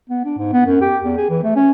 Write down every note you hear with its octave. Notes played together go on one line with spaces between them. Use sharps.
B3
D4
G#2
B3
F#2
G4
E2
G#4
E3
A3
C#4